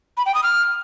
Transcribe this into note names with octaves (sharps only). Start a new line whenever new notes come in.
B5
G5
D#6
F6